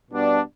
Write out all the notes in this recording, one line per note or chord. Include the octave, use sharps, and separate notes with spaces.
B2 G3 B3 D4